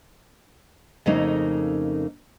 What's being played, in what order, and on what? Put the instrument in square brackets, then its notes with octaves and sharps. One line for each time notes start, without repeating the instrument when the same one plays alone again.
[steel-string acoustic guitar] F2 C#3 A3 A#3 D#4